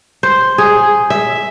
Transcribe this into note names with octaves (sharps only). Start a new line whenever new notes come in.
C5
G#4
E5